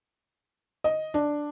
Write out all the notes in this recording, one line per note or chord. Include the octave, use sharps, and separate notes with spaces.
D#5
D4